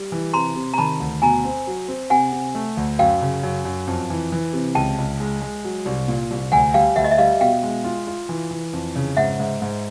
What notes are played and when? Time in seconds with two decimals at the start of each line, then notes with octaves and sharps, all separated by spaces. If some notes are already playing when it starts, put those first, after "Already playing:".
Already playing: G3
0.12 E3
0.34 C3 A#5 C6
0.56 C3
0.74 A#5
0.78 D#3 A5 B5
1.00 D2
1.22 B2 G#5 A#5
1.45 C4
1.67 F#3
1.88 C4
2.10 C3 F#5 G#5
2.33 C3
2.55 A3
2.77 D2
2.99 F#2 F5 G5
3.21 C#3
3.43 F#2
3.65 F#2
3.87 F2
4.10 E3
4.32 E3
4.53 C3
4.75 C#2 G5 A5
4.98 C#2
5.20 G#3
5.41 G#3
5.65 F#3
5.85 C2
6.08 A#2
6.31 C2
6.52 D2 F#5 G#5
6.74 G3 F5 G5
6.96 D2 E5 F#5
7.04 D#5
7.11 E5
7.18 G3 D#5 F5
7.41 B2 F5 G5
7.63 G#3
7.84 F4
8.07 F4
8.29 E3
8.51 E3
8.73 F2
8.96 C#3
9.17 G#2 E5 F#5
9.40 G#2
9.62 G#2